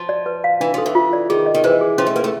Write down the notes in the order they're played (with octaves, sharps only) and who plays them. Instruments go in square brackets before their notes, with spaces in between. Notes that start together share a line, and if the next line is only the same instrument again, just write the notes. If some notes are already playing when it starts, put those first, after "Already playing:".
Already playing: [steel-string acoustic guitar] F3
[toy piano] D5
B4
F5
[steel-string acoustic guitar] E3 [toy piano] D4
[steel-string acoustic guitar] F3 [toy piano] A4
[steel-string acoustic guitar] E3
[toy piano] F4
D5
[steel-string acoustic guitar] D#3 [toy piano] G#4
[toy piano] D#5
[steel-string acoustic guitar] D#3
[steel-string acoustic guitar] E3 [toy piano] C5
[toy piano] G#4
[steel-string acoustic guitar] F3 [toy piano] C#4
[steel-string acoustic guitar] A3
[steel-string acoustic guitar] A#3 [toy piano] B4
[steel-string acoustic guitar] A3